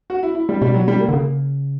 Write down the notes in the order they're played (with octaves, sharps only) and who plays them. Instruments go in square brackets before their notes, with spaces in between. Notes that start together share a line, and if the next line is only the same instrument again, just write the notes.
[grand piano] F#4
E4
E4
G3
[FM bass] B2 [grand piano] G3
[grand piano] F#3
G3
A#3
[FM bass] D3
C#3